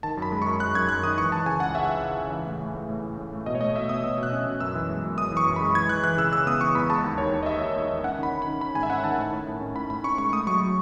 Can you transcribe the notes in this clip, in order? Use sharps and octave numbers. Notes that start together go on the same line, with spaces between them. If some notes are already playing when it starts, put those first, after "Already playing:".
D#3 A5
F#2 B5
G#3
C#6
F#2
F#2 F#6
F#2 G#6
F#2 F#6
D#3 D#6
E3 C#6
E3 A5
C#3 G#5
C#2 F#5
C#3 E5
C#3
C#3
C#3
E3
A2
A3
A2
A2
A2
A2
A3
B2 D#5
C#5
A3 D#5
B2 E5
B2 D#6
B2 E6
B2
F#6
C#4
B2
F#2 E6
E3
G#3
F#2
F#2 D#6
E3 C#6
F#2
B5
G#3
E3 G#6
E3 F#6
E3 F#6
C#3 E6
C#3 E6
B3 D#6
E3 C#6
E2 B5
G#3 A5
D#2
D#3 C#5
D#2
D#5
D#2 E5
D#2
D#2
D#3
C#4 F#5
D#3 B5
C#4
B5
D#3
C#4 B5
G#2 G#5
E5
C#4 F#5
D#3 A5
A2
A2
A2
C#4
A2 B5
A2 B5
C#4 C#6
G#3 C#6
A3 D#6
F#3 C#6
F#3